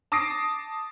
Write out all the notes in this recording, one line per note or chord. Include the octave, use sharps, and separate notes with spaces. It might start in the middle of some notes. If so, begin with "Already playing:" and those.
A5 D6 D#6 A#6 C7 D7